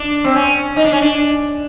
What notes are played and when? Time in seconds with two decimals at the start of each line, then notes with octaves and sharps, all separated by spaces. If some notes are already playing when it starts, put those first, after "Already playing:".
Already playing: D4
0.24 C4
0.35 C#4
0.76 D#4
0.84 D4
0.92 C#4
1.01 D4